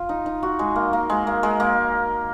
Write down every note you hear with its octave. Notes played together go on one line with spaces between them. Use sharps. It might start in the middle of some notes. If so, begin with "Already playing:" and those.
Already playing: F4
D#4
D#4
F#4
G#3
A#3
A#3
G#3
A#3
G#3
A#3